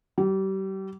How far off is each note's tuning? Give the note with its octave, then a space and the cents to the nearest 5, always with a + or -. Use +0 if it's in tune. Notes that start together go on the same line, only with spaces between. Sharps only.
G3 -35